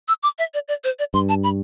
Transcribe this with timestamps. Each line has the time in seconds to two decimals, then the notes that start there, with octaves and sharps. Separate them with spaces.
0.08 E6
0.23 D6
0.39 E5
0.54 D5
0.68 D5
0.84 C5
0.99 D5
1.14 G2 C6
1.29 A5
1.44 B5